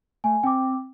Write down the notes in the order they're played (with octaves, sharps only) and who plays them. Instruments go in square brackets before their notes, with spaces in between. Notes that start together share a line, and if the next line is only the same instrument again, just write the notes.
[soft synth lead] A3 [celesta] G#5
[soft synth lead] C4 [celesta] G5 D6